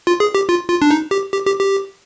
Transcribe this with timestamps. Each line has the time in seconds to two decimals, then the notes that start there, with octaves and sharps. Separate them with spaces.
0.07 F4
0.20 G#4
0.35 G4
0.49 F4
0.69 F4
0.82 D4
0.91 D#4
1.11 G4
1.32 G4
1.46 G4
1.60 G4